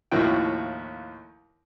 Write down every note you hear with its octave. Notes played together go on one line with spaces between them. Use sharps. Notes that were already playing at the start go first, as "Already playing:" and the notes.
D#2 A2 F3 E4 F#4 G5